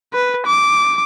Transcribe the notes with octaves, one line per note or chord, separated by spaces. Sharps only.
B4
D6